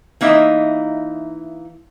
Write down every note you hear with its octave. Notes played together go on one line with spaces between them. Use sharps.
E3 A#3 D#4 D#5 E5